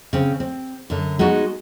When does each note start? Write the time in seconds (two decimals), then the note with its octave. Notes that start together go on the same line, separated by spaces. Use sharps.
0.13 C#3 C4
0.40 C4
0.90 F#2 D3
1.19 G#3 B3 D#4 F#4